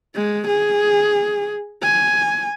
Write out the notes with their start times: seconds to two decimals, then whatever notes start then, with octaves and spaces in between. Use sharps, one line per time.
0.15 G#3
0.48 G#4
1.83 G#5